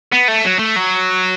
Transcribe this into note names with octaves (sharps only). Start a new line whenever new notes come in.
B3
A3
F#3
A3
F#3